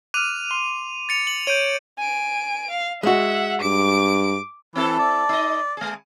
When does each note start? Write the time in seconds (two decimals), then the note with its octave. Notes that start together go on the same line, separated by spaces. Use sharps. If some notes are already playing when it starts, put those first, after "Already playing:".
0.14 D6 F6 F#6 D#7 F7
0.51 C6
1.09 A6 C#7 F7
1.27 F#7
1.47 C#5 G6 D7 D#7
1.98 G#5 D7
2.71 F5
3.03 G#3 F#4 E5 F#5
3.62 G2 D6 D7
4.75 E3 C4 E4 A4
4.99 D5
5.29 D#4 D#5
5.77 G#3 G#4